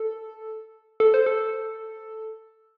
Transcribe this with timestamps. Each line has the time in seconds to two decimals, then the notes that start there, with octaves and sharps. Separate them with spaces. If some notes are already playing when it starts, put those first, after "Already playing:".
Already playing: A4
1.00 A4
1.14 C5
1.26 A4